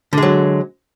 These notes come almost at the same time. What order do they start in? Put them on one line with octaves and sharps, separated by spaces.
D3 G#3 F#3